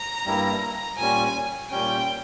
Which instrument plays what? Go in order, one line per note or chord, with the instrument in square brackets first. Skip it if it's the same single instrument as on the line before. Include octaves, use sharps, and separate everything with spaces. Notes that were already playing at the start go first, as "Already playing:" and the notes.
Already playing: [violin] A#5
[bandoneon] G2 G3 A#3 E4
[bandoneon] A#2 G3 C#4 [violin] G#5
[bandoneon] A#2 G3 C#4 [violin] G5